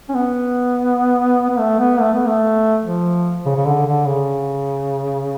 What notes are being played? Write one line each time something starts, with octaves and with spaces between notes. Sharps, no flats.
C#4
B3
B3
A3
B3
A3
B3
A3
F3
C#3
C#3
D3
D3
C#3